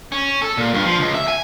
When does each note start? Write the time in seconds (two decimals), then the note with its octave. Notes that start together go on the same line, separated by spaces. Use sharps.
0.12 C#4
0.42 A4
0.57 A#2
0.74 G2
0.85 F3
1.00 C#2
1.14 E5
1.28 G#5